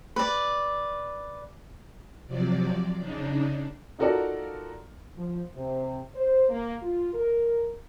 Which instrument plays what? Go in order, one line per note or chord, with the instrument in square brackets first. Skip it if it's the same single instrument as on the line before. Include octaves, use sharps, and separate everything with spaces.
[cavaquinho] B4 D5
[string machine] C3 F3 F#3 D5
C#3 D4 D#4
[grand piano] D#4 F4 F#4 A4 A#4 D5
[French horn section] F3
C3
C5
A#3
F4
A#4